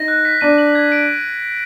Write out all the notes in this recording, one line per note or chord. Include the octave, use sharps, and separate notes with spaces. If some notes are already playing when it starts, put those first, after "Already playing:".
Already playing: D#4 A#6
F#6
B6
D4 D#7
F#7
G#6
D7